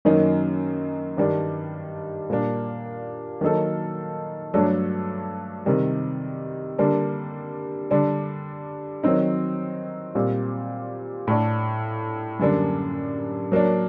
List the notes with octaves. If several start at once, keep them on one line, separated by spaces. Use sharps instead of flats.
F#2 D#3 F#3 A#3 D#4
G2 D#3 G3 D4
A#2 G3 A#3 D4
D#3 F#3 A#3 D#4 A4
G2 F#3 A3 D4 A4
C3 D#3 G3
D3 G3 A#3 D4
D3 G3 D4
D#3 F#3 C4 D#4
A#2 G3 C4
A2 A3 D4
F#2 D3 G3 A#3 D4
F#3 A#3 D4